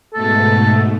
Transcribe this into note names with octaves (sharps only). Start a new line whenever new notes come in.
G#2 B2 A3 A4